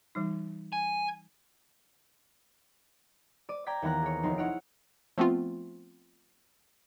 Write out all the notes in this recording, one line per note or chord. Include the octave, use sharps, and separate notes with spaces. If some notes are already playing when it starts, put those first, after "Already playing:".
E3 G3 D#4
G#5
D5 D6 D#7
D5 G5 A#5 D6 G#6 B6
D#2 E3 B3 A#5 F#6
G#4 C#5
F1 F3 D#4 C6
E4 C#5 F#5 F6 D7
F3 A3 B3 C4 F4